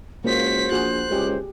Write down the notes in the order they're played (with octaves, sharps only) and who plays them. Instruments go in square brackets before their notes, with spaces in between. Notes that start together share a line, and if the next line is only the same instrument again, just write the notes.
[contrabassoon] C#2 [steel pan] A#3 [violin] F#4 B6 [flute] C5
[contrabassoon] A#1 [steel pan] F4 F#4 G#4 [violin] F#6
[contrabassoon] C#2 [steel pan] G4 G#4